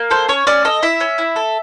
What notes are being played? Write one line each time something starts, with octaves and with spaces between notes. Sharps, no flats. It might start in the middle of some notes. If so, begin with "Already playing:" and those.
Already playing: A#3
A4 C5
C#4 C#5
C#4 D5
A4 D#5
E4 E5
C#4
E4
A4